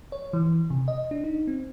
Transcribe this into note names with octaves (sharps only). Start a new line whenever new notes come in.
C#5
E3
C3
D#5
D4
D#4
C4